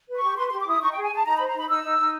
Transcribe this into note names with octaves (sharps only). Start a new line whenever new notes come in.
B4
C#6
G4
B4 C6
G4 C6
D6
E4 D#6
D#4 C#6
G#4 G5
G#5
G#4 A5
D#4 A#5
C5 B5
A#5
D#4 B5
D#4 E6
D#4
D#4